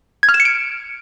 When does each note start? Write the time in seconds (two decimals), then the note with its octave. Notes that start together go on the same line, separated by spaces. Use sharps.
0.23 G#6
0.29 F6
0.34 E7
0.40 C#7
0.45 D7